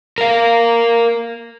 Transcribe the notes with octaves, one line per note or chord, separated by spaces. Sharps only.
A#4 F5